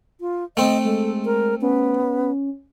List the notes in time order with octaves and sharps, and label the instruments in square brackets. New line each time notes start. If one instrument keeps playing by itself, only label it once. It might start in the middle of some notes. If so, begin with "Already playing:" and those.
[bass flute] F4
[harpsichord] A3 C4 [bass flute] D#5
[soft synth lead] G#3 [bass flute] A4
[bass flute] A#4
[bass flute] B3 [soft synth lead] C#4